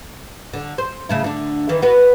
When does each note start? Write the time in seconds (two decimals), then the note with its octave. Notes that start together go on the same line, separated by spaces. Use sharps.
0.53 D3
0.78 C5
1.09 C#3 A3 E4
1.24 D3 D4
1.69 D#3 E3
1.82 B3 F#4 B4